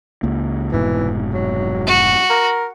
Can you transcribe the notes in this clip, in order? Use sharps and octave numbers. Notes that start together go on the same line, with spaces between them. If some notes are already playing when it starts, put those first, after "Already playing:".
C#2 A#3
F1 G#2 B2 E3
F#3
F#4
A#4